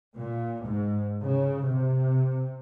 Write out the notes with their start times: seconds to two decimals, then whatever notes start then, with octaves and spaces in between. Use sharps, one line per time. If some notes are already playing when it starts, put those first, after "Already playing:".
0.17 A#2
0.66 G#2
1.22 C#3
1.66 C3